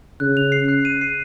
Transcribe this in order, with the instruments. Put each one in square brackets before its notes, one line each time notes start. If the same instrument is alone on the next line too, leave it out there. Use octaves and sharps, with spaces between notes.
[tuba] C#3 [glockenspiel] F#6
[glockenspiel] F7
C7
F#6
D#7
C7